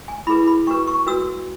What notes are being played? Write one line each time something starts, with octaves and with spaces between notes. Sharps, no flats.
G#5
E4 G#4 B4 B5
B5
D4 F#4 B4 C#6
C#6
D4 F#4 B4 E6